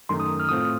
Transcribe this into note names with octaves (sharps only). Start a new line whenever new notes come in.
F#2 D#3 A3 C6
D#6
F6
A2 A3 C4 F4 D#6